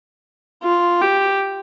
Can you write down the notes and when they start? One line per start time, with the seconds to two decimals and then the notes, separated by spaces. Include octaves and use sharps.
0.63 F4
1.01 G4